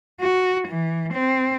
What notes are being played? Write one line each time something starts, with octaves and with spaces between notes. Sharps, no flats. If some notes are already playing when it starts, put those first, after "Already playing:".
F#4
E3
C4